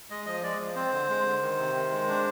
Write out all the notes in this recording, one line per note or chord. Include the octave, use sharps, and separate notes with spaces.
G#3 D#5
F3 D#5
G#3 D5
F3
C4 C5
D3
G#3
D3
D#3
C3
D#3
G#3
D4